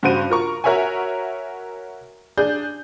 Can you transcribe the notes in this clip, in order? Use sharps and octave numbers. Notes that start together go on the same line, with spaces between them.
G2 C#3 F#4 C5 D#7
F4 A#4 C#6
F#4 A#4 C#5 E5 F#5 G#5
D4 G#4 G6